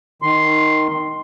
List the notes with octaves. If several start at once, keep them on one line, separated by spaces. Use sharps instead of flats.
D#3 C6